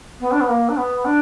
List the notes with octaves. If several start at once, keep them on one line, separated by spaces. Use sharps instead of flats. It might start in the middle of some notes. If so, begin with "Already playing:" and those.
B3
D4
B3
A#3
D4
B3
D4